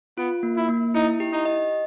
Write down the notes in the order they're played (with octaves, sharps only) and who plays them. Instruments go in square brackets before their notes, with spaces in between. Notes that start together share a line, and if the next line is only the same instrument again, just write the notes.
[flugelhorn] B3 [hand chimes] F4
[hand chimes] A#3
[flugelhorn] E4
[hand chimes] A#3
[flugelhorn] D#4 [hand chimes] E4
[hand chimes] G4
[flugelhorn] D#4
[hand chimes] D#5